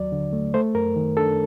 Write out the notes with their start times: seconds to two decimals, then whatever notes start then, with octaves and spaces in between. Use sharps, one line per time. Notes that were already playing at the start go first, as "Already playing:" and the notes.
Already playing: D#2 F#3 D5
0.12 D3
0.33 A3
0.54 A3 C5
0.75 F#2 A#4
0.96 D#3
1.17 D4 A4